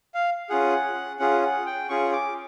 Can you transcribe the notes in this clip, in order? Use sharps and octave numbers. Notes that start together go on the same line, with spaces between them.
F5
C#4 F4 G#4 F#5
C#4 F4 G#4 F#5
F#5
G5
C#4 F4 G#4 C#6
D6